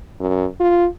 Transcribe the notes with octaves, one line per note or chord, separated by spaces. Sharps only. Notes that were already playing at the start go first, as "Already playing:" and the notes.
F#2
F4